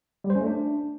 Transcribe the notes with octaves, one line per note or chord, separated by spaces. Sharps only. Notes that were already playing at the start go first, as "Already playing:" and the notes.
G3
C5
C#4
A3
D4